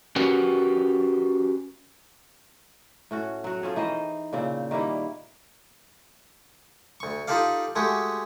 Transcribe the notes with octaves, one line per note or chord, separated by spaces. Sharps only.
C#4 F#4 G4 A#4 B4
A2 C#4 F#4
F#3 F#4
F3 C#4 G#4 A4
E3 D#4 C5 D#5
A#2 C#3 C4
D#3 G3 A#3 E4
D2 C#6
D#4 F4 G4 A4 D5 F5
G#3 A3 F#4 G4